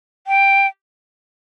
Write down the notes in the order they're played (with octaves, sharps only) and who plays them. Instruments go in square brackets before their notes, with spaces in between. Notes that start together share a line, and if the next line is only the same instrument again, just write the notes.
[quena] G5